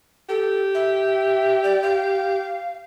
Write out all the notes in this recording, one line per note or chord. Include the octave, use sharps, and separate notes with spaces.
G4 A4
E5
D5
F5